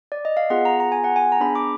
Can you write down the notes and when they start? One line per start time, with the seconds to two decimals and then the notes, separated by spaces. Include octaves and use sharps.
0.12 D5
0.25 D#5
0.37 F5
0.50 B3 F4 G#4 F#5
0.65 A#5
0.80 A#5
0.92 G#5
1.04 F#5
1.16 G#5
1.32 A#5
1.40 B3 D4 G#4 B5
1.55 D6